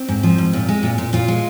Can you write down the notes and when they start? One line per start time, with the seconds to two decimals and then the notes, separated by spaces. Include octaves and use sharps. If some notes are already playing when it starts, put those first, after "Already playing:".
Already playing: C4
0.08 G#2
0.23 F3
0.38 G#2
0.53 A#2
0.69 G#3
0.83 A#2
0.98 A#2
1.13 A#2 F4
1.28 G#3